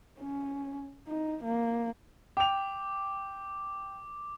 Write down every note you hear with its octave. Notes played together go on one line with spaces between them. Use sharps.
C#4
D#4
A#3
G5 D6 F7